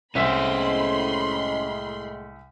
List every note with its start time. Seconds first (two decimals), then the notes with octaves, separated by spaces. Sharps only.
0.15 C2 A2 G#3 C#4 C5 E5 B5 C6